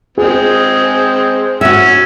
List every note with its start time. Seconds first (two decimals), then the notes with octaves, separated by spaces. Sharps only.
0.18 G#3 C4 G#4
1.61 C#4 F#4 E5